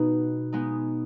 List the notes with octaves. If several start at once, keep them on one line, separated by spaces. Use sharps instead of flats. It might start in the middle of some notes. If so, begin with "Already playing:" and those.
Already playing: B2 B3 D#4 B4
G#3 B3 D#4